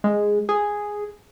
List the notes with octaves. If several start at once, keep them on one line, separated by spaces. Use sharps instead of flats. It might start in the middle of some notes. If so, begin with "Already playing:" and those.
G#3
G#4